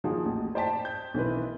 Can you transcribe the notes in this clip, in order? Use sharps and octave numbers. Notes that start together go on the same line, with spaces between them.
D#3 F3 A#3 F#4 G#4
A1 D#2
C5 D5 G5 A5 B6
G6
B1 D#3 E3 C4 B4